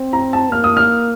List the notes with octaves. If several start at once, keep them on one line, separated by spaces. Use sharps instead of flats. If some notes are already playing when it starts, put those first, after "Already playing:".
Already playing: C4
A#5
A5
A#3 F6
D#6
F6